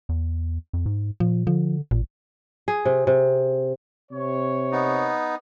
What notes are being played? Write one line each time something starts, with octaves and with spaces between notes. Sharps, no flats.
E2
F2
G#2
A#2 F3
D3 F3
A1 A#2
G#4
C3
C3
C3 C#5
B3 D#4